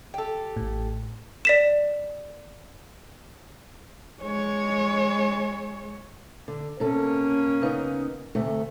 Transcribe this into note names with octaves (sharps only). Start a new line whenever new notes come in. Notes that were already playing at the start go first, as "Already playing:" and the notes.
G4 A4
A1 A2
D5 B6 E7
G#3 C#5
D3
C3 A#3 C#4 A4
C#3 B3 D#4
D2 C3 A3